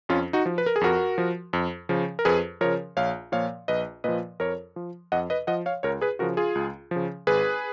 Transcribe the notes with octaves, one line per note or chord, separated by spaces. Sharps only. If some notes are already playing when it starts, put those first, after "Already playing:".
F2 C#4 F4
D#4 F#4
F3
B4
A#4
G#4
F2 F#4 A#4
F3
F2
C#3 F3
A#4
F2 G#4 B4
C#3 F3 A#4 C#5
A#1 C#5 F5
A#2 F3 C#5 F5
A#1 B4 D#5
A#2 F3 B4 D#5
F2 A#4 C#5
F3
F2 D#5 F#5
B4 D#5
F3 D#5 F#5
C#5 F5
C#2 A#4 C#5
G#4 B4
C#3 F3 F#4 A#4
F4 G#4
C#2
C#3 F3
G#1 G#4 B4